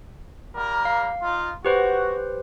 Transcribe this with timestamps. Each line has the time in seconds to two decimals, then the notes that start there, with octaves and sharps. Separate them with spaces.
0.55 G3 A#3 A#4
0.85 F5
1.22 D#4 F4
1.65 F#4 G4 B4 C5